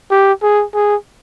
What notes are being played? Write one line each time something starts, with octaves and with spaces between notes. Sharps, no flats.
G4
G#4
G#4